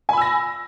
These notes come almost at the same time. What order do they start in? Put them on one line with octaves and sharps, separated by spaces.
G#5 B5 E6 A#6